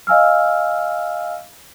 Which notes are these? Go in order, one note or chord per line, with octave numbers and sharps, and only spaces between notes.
D#5 F5 G#5 E6 F6